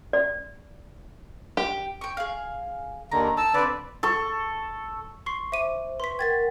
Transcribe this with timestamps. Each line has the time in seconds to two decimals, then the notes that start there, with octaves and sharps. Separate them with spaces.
0.13 D5
1.57 G4
2.01 G5 C#6
2.17 G#4 F5
3.11 D#2 D3 D#3 A#5
3.37 D#4 A5 E6
3.54 D3 A#3 C4 B4 D5
4.03 A4 C#6
5.26 C6 C#6 C7
5.52 C5 E5 D6 D#7
6.00 B4 C6 C#6 B6
6.19 A#4 F#5 G5 G#6 A6 B6